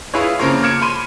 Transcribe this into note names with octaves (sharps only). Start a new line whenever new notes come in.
E4 F4 G#4 B4 C#5
C#3 F3 A#3 A#4 C5 C#5
D6 F6 G#6 C#7 D7 E7
B5 C6 D#7